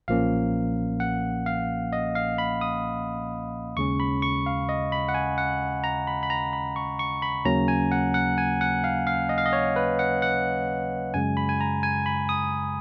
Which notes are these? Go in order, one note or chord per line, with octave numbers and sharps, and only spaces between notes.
B1 A#2 F3 A#3 C#4 F5
F#5
F5
D#5
F5
B5
D#6
D#2 C#3 G#3 C#4 C#6
B5
C#6
F5
D#5
B5
F#5
G#5
F#5
A#5
B5
B5
A#5
B5
C#6
C#6
B5
D#2 C#3 F#3 A#3 C#4 A#5
G#5
F#5
F#5
G#5
F#5
F5
F5
D#5
F5
D#5
C#5
B4
F#5
F#5
F#2 C#3 G#3 G#5
B5
G#5
A#5
G#5
B5
D#6